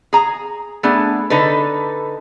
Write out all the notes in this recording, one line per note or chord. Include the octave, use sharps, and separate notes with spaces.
G#4 A#5
A3 B3 D4 G#4
D3 D#4 A4 B4